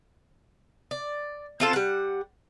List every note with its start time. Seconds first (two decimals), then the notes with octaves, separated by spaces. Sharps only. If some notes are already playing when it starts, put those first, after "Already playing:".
0.91 D5
1.60 C4 F4 A4
1.73 G3 F#5